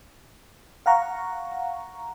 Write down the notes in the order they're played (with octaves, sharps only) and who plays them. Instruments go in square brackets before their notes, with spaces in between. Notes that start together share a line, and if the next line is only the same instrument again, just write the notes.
[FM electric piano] F5 F#5 A#5 C#6